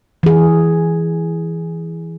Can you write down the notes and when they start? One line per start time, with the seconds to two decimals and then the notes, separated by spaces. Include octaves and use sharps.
0.23 E3 G#4